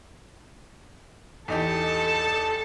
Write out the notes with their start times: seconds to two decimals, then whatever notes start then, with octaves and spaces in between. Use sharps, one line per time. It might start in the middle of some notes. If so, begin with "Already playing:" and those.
1.48 E2 D#4 G4 A4 A5